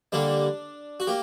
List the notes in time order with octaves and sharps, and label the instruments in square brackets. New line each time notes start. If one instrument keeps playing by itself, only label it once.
[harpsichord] D3 G3 A#3 D4
F#4
A#3 G4